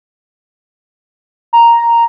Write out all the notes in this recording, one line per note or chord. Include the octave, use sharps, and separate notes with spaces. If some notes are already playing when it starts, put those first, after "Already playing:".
A#5